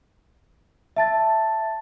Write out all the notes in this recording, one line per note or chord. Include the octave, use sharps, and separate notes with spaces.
E5 A5 A6